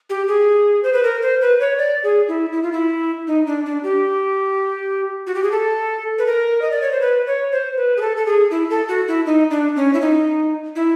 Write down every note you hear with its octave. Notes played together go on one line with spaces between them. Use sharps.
G4
G#4
C5
B4
A#4
C5
B4
C#5
D5
G#4
E4
E4
F4
E4
D#4
D4
D4
G4
F#4
G4
G#4
A4
B4
A#4
D#5
D5
C#5
C5
B4
C#5
C5
B4
G#4
A4
A4
G#4
E4
A4
F#4
E4
D#4
D4
C#4
E4
D#4
E4